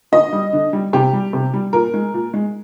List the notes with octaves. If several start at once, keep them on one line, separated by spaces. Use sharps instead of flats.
D3 D#5
G3
D3
G3
C3 G4
G3
C3
G3
A#2 A#4
G#3
A#2
G#3